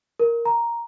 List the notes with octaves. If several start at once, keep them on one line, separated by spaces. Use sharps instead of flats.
A#4
A#5